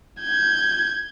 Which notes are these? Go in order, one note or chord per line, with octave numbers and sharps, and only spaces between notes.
G6 G#6